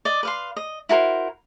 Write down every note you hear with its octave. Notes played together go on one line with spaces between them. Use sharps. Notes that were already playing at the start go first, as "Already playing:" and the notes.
D5 D#5
B4 F5 C6
D#5
E4 F#4 A#4 C5